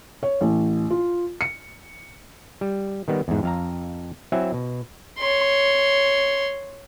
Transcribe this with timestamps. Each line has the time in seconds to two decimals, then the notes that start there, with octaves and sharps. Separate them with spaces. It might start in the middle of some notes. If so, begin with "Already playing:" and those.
0.23 C#5
0.41 A1
0.90 F4
1.41 C#7
2.61 G3
3.08 D#3 G3 B3
3.28 E2 G#2
3.43 F2 F5 A#5
4.32 F#3 C4 E4 E5 F#5 G#5
4.54 B2
5.19 C#5 C6